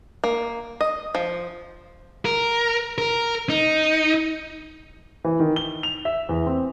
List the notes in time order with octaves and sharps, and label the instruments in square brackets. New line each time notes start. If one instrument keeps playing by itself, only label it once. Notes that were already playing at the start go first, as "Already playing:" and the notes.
[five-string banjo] A#3
D#5
F3
[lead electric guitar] A#4
A#4
D#4
[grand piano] E3
D#3
G7
F7
E5
E2
C4